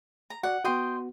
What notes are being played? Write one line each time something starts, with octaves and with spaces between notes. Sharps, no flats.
A#5
F#4 D5 F#5
B3 F#4 D#5 G5 C6